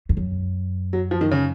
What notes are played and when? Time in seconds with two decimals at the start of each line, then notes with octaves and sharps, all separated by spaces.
0.09 F2
0.17 F#2
0.93 F#3
1.11 F3
1.21 D#3
1.31 C#3